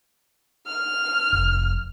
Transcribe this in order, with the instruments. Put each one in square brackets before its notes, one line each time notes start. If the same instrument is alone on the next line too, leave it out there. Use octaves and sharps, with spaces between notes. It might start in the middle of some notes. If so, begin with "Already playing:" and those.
[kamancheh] F6
[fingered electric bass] F1